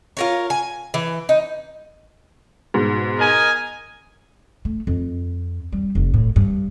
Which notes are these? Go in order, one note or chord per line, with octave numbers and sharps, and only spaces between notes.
F4 A#4 C#5
G#5
E3
D#4
G#2 B2
A#4 D#5 G#5
A3
F2
G3
F1
A2
G2